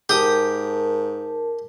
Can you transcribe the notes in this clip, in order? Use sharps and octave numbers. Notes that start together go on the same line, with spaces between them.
G#2 G4 A#4 A5 D#6